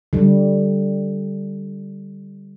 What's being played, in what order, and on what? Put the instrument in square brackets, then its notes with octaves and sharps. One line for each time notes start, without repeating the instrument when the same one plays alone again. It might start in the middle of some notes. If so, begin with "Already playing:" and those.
[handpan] D3 G3